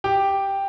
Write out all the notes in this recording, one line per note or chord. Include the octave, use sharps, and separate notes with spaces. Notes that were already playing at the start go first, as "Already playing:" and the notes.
G4 G5